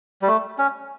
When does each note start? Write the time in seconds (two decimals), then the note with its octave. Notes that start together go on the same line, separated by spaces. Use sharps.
0.22 G3
0.28 A3
0.58 C#4